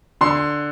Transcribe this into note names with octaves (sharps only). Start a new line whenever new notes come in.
D3 C6